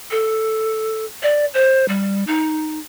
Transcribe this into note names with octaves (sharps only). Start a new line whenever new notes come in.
A4
D5
C5
G3
D#4